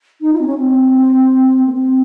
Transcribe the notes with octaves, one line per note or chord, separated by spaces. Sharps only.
D#4
F4
C4
C#4
C4
A#3
C4